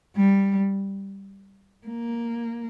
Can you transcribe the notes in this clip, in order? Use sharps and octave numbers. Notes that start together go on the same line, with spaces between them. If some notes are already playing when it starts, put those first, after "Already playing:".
G3
A#3